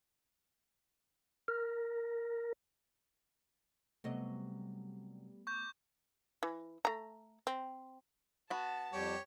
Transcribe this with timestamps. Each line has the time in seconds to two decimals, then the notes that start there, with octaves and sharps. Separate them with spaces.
1.48 A#4
4.04 C3 F#3 G3 A3 B3 D#5
5.47 C#6 D6 G6
6.43 E3
6.85 A3 A#5
7.47 C4
8.50 B3 F#4 A5
8.93 F2 G3 G4 C#5